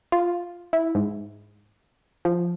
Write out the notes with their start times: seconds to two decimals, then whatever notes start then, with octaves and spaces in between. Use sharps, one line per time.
0.12 F4
0.73 E4
0.95 G#2
2.25 F3